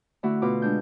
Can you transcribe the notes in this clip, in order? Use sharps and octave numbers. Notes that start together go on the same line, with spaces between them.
D3 A3 E4 F#4
B2 F4 D6
G#3 D4 G6